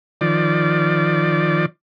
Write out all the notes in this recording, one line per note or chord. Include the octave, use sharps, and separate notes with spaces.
D#3 F3 D5